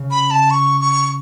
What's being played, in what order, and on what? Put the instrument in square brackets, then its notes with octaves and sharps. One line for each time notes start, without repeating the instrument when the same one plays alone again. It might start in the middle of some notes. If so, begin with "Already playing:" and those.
Already playing: [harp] C#3
[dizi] B5
A5
C#6
C#6